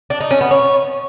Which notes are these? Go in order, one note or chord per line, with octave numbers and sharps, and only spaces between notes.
D4
D#4
C#4
B3
C#5